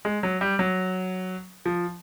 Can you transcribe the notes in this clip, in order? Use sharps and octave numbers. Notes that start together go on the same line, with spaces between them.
G#3
F#3
G3
F#3
F3